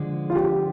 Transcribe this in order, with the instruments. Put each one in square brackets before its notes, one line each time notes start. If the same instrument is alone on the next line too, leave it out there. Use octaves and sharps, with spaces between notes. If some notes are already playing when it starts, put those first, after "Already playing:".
Already playing: [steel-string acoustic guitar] D3 F3 G#3
[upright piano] F4
G4